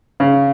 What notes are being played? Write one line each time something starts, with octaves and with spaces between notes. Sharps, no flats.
C#3